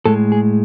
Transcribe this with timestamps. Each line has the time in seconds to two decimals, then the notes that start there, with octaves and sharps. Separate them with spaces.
0.06 A2 G#3 A4
0.32 G#4